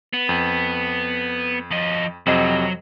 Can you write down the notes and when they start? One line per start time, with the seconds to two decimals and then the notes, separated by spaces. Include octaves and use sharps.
0.13 B3
0.29 F2
1.71 F3 D#5
2.26 F2 C3 F#3 D#5